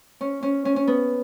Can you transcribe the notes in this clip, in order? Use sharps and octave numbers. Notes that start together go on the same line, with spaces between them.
C#4
C#4
C#4
C#4
B3